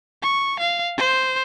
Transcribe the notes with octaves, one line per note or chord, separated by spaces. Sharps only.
C#6
F5
C5